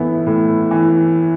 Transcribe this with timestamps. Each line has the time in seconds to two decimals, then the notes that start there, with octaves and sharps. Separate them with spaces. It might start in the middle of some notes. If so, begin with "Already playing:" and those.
Already playing: A2 E3 B3 E4
0.27 A2
0.71 E3